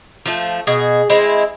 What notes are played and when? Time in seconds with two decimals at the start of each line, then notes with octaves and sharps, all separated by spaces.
0.26 F3 A3
0.67 B2 G#4
1.10 G#3 C4 E4